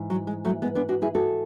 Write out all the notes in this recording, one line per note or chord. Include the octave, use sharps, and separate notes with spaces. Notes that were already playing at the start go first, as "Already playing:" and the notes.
Already playing: G#2 E3
F#3
G#3
F#3 A3
G#3 B3
B3 D4
D4 F#4
E4 G#4
F#4 A4